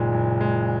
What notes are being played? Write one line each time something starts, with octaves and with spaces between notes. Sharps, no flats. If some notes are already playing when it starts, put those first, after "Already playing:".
Already playing: F#1 A#2 D#3 G#3
F#1
G#3